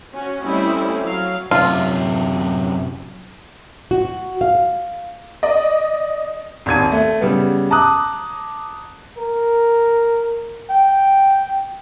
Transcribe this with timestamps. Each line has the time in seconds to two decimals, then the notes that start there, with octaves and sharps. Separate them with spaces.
0.13 C#4 F#4
0.43 G3 A3 C4 C#4 E4 D#5
1.01 F#3 F5
1.51 F#2 C3 F4
3.91 F#4
4.41 F5
5.43 D5 D#5
6.66 G#1 D#2 G#6 D#7
6.92 A3
7.21 C#3 G3 B3
7.71 A5 A#5 D6 D#6 F#6
9.17 A#4
10.69 G5